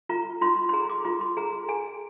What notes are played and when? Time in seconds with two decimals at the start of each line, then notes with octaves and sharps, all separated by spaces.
0.09 F4 A#5
0.41 F4 C6
0.69 C6
0.73 G#4 A#5
0.89 D6
1.05 F4 C6
1.21 C6
1.37 G#4 A#5
1.69 G#4 G#5